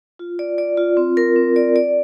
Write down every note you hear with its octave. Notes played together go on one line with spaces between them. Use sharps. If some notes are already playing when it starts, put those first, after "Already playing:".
F4
D5
D5
F4
C4
A#4
C4
D5
D5